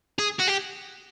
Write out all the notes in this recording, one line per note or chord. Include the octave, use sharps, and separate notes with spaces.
G#4
F#4
G4